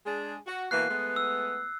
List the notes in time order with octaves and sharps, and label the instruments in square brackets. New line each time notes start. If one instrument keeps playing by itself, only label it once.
[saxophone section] G#3 D4 G#4
F#4
[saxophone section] B2 E3 A#3 [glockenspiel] F#6 C7
[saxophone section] G#3 A3 B3
[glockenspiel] E6